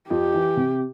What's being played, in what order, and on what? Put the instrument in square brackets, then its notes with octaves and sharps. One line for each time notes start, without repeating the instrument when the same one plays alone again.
[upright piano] F2 [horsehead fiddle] G4
[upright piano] E3
C3